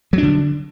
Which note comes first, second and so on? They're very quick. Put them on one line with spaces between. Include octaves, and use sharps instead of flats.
F#3 D4 D3